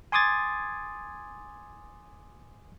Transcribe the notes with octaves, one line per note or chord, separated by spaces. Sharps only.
G#5 C6 D6 D#6 G#6 A6